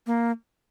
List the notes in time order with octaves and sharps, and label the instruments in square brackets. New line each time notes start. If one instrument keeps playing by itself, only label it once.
[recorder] A#3